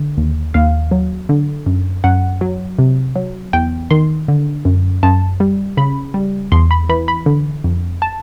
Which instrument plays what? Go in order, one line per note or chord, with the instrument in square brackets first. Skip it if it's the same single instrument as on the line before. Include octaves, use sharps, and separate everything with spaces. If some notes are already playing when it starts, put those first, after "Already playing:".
Already playing: [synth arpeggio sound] D3
D#2
D#2 F5
F#3
D3
F#2
F#2 F#5
F#3
C3
F#3
E2 G5
D#3 C6
D3
F#2
F#2 A5
G3
C#3 B5
G3
E2 C6
B5
E3 B5
B5
D3
F2
A5